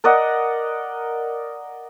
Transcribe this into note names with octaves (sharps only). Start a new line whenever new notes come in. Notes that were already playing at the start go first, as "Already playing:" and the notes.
A#4 D5 D#5 F#5